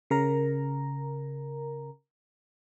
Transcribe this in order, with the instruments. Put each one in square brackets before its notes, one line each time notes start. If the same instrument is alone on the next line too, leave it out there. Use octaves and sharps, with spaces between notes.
[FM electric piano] C#3 A#4 A#5